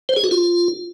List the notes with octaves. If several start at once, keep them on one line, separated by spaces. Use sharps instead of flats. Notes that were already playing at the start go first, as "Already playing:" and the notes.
C5
G#4
F#4
F4